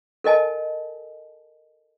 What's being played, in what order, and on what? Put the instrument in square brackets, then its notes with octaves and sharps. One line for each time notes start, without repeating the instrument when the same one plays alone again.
[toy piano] A4 A#4 D#5 G#5 A5